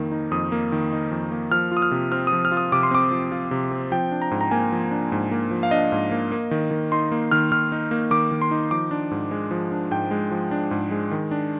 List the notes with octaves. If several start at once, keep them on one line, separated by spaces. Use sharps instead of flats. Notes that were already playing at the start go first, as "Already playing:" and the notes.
Already playing: F2 D#3 A#3 D#4
D#4
F2 D#6
A#3
D#3
D#4
F2
A#3
F3 F6
F4
D#6
F6
C3
C4 F6
D#6
F3
F6
F4
D#6
C3 D6
C6
C4 D6
F3
F4
C3
C4
F3 G5
D4
A#5
G#2
A#5
A#3 G#5
F3
D4
G#2
A#3
F3
F5
D4 D#5
G#2
A#3
A#3
D#3
D#3
D#4 C6
A#3
D#3 F6
D#3 F6
D#4
A#3
D#3 D6
D#3
C6
D#4
F3 D6
D4
G#2
G#3
F3
D4
G#2 G5
G#3
F3
D4
G#2
G#3
D#3
D4